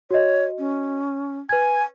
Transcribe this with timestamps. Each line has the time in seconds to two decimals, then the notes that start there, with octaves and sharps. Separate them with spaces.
0.11 F#4 C#5 D#5
0.58 C#4
1.49 B4 G#5 G#6